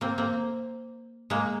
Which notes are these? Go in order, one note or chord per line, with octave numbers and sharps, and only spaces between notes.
A#3 C4
A#3 C4
G#3 A#3